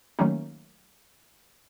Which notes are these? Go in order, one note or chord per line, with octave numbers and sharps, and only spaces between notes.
D#3 F#3 A3 A#3 C#4 D#4